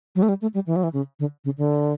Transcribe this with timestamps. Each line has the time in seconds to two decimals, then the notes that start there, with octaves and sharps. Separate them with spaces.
0.15 F#3
0.23 A3
0.29 G3
0.42 A3
0.54 G3
0.67 E3
0.76 F#3
0.83 E3
0.93 C#3
1.20 D3
1.45 C#3
1.58 D3